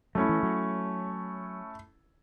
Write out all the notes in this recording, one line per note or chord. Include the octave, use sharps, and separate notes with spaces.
F#3 A3 C#4 E4
E3
F#3